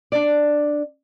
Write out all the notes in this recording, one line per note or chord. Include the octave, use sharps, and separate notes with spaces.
D4 D5